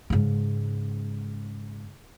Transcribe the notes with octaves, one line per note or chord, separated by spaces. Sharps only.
G#2 C#3